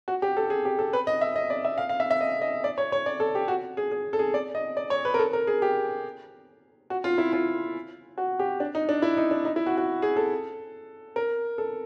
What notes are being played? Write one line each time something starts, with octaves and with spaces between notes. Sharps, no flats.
F#4
G4
A4
G#4
G4
A4
B4
D#5
E5
D#5
D5
E5
F5
F5
E5
E5
D#5
D#5
D5
C#5
C#5
D5
A4
G4
F#4
G#4
G#4
A4
G#4
D5
D#5
D5
C#5
B4
A#4
A4
A#4
G#4
G4
F#4
F4
E4
F4
F#4
G4
D4
D#4
D4
E4
D#4
D4
D#4
E4
F#4
F#4
G#4
A4
A#4
A4